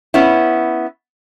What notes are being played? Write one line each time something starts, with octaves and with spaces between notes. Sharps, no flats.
B3 C#4 E4